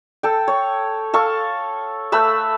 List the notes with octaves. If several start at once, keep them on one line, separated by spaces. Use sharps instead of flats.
A4 G5
C#5
A4 F5 C#6
A3 B4 E6